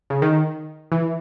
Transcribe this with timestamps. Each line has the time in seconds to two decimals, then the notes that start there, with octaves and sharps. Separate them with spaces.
0.10 C#3
0.22 D#3
0.92 E3